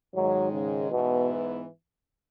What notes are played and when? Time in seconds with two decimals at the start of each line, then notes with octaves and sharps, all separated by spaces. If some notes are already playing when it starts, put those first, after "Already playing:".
0.15 G#2 D#3 F#3 G#3
0.52 C#3
0.90 G#2 B2 E3 B3 E4